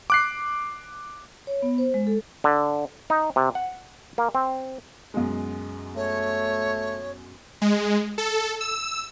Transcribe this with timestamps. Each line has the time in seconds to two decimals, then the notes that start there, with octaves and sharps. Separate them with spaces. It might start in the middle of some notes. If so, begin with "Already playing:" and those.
0.10 D6 F#6 C7
1.47 C#5
1.62 B3
1.78 C5
1.94 G#3
2.07 A4
2.44 D3
3.10 D#4
3.36 C3
3.55 F#5
4.18 A#3
4.35 C4
5.14 F#2 B2 G#3
5.96 A3 C#5
7.62 G#3
8.18 A4
8.61 E6